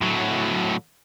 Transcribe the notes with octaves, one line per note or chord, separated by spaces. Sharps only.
A2 F#3